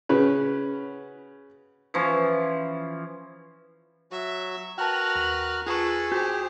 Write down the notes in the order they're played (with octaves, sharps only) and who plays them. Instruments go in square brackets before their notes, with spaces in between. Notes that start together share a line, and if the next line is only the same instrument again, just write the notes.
[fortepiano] C#3 C#4 F#4 B4
[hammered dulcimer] E3 F3 C#4
[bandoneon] F#3 F#4 [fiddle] E5
[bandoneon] F#4 F6 F#6 [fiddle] A#4 B4 [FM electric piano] G5 A5
[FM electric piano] D#2
[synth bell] F4 C#6 [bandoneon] G#4 [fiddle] A4 B4
[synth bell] F#4 [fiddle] G4 C5